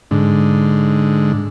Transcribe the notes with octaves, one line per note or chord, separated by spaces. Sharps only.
G#2 D3